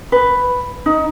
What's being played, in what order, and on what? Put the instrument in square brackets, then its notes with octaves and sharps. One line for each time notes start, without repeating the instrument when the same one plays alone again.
[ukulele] B4
D#4